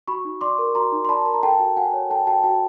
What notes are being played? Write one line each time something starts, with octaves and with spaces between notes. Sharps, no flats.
F#4 B5 C#6
D#4
D5 C6 D6
A#4
F#4 A#5 C6
D#4
C6
D5 A5 B5
A#4 B5
A#5
A4 G5 A5
F#4
F#4 F#5 G#5
C#5
A4 G5 A5
F#4 G5 A5
F#4 G5 A5